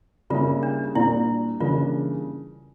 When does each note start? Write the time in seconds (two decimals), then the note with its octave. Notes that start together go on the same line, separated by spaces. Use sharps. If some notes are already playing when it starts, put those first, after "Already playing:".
0.30 C#3 G3 A#3 E4 F4
0.63 D4
0.95 A#2 G3 D4 E4
1.60 C#3 E3 G3 A#3 D4 F4